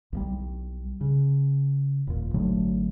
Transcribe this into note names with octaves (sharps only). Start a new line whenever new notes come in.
B1 F3 G3
C#3
D#1 A#2
G#1 D3 F#3 A3